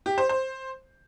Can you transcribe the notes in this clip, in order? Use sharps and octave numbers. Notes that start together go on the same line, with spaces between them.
G4
C5
C5